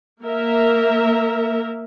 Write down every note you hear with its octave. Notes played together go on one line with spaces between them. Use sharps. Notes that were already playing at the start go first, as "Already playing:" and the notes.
A#3 A#4 E5